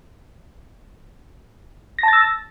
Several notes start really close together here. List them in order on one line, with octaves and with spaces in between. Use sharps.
A#6 A5 A6 E6